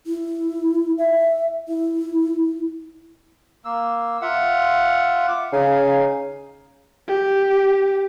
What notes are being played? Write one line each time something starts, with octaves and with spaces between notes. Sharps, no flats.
E4
E5
E4
A#3 E6
F4 E5 F#5
D6
C#3 D#4 F5 G#5
G4